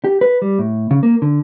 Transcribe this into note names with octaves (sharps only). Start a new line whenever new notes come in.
G4
B4
G3
A2
C#3
A#3
D3